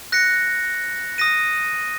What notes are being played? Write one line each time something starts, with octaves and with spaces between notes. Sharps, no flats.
F#6 A#6 C#7
D#6 A#6 D#7